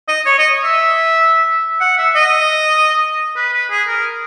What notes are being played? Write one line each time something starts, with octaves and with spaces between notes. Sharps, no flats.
D#5
C#5
D#5
E5
F#5
E5
D#5
B4
B4
G#4
A#4